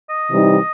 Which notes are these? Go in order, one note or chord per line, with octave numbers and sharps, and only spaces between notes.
D#5
C3 E3 G3 D#4